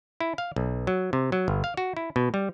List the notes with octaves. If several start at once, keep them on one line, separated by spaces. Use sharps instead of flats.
E4
F5
B1
F#3
C3
F#3
G1
F5
F#4
E4
B2
G3